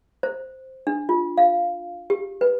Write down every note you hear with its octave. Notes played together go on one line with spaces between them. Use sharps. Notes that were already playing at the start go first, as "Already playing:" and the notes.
C5
D4
F4
F5
G4
B4